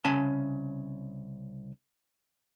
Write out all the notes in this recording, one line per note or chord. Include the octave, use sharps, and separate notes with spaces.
C2 C#3 C#4 G#5 A5